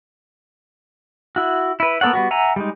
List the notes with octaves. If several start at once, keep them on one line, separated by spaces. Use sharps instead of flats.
E4 F#4
E4 B4
A#3 B3 A4 C#5 F#5
G3 B3 F#4
E5 F#5 G#5 A#5
G3 G#3 D#4